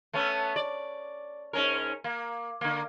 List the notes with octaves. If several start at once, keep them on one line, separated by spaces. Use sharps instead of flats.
A3 B3 C#4
D5
G#2 C#4 A#4
A#3
D3 A#3